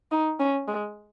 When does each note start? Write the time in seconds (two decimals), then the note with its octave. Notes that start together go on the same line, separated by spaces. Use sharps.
0.11 D#4
0.40 C#4
0.68 G#3